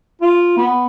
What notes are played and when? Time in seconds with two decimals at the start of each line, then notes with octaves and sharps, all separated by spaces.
0.21 F4
0.57 B3